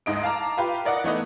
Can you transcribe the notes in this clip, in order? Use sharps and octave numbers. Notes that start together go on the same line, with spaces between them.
D2 G#2 D#5 D7
F5 A5 A#5 D6
F4 G4 B4 F5
A#4 D5 D#5 F#5
E3 A3 B3 D#4